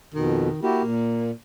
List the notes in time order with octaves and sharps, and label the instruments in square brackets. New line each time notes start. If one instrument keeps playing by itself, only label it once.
[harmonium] F2 B2 [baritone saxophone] D#3
[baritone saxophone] A#3 [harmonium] E4 F#4 G4
[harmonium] A#2